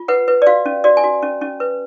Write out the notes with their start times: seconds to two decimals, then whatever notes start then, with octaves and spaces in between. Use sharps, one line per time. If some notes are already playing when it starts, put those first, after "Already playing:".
Already playing: F4
0.08 B4 F#5
0.28 B4
0.42 D5
0.47 F#4 F5
0.66 C#4
0.84 F#4 D5
0.97 G#5
1.04 F#4
1.23 C#4
1.41 C#4
1.60 B4